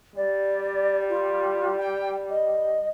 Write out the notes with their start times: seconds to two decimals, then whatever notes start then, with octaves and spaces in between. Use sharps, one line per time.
0.16 G3 D5
1.09 F4
1.77 G5
2.29 D#5